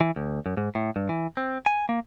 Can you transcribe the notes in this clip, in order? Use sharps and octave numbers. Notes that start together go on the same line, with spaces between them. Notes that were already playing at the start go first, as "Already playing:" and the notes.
E3
D2
F#2
G#2
A2
G2
E3
C4
G#5
A#3